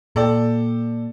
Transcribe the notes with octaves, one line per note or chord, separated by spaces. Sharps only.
A#2 A4 D5 G5